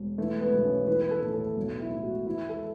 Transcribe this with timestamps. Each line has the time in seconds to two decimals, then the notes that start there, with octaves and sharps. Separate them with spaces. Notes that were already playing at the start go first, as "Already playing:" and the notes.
Already playing: E1
0.18 E3 A3
0.41 B3
0.53 B1
0.64 C#4
0.87 E3 B4
1.01 B4
1.11 A4
1.23 A2
1.33 A4
1.57 B1
1.80 E4
1.91 A2
2.03 F#4
2.26 E3 E4
2.49 A4